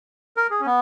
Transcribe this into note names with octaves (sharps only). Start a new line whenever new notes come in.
A#4
G#4
C#4
B3